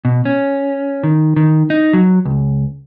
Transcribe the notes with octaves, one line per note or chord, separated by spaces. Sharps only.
B2
C#4
D#3
D#3
D#4
F#3
C#2